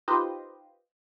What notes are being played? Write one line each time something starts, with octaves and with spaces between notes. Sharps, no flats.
D#4 F4 G4 B4 C5 D#5